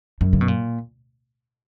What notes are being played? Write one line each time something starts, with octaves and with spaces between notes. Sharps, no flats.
F#2
C#3
B2
A#2